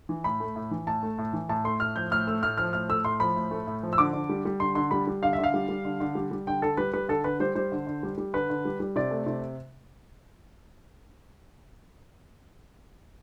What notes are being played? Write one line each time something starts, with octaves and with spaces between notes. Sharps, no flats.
E3
A2 B5
A3
A2
E3
A2 A5
A3
A2
E3
A2 A5
A3 C6
A2 F6
F3 G6
A2 F6
A3 E6
A2 F6
F3 F6
A2 F6
A3 E6
A2 C6
F3 B5
A2
A3
A2
F3
E6
D3 D6
D3
G3
G3
D3 C6
D3 C6
G3 B5
G3
D3 F5
E5
D3
F5
G3
G3
D3
D3
G3
G3
D3 G5
D3 A4
G3 B4
G3 B4
D3 A4
D3 B4
G3 C5
G3 C5
D3
D3
G3
G3
D3 B4
D3
G3
G3
C3 D5
A3
C3